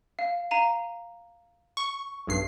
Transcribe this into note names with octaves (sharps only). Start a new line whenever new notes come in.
F5
F5 A#5 D#7
C#6
B1 G2 C7